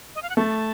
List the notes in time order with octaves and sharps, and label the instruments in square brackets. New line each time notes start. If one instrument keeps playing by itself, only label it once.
[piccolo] D#5
F5
F#5
[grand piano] A3 [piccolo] A5